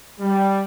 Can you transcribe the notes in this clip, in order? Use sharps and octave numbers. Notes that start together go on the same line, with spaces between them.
G3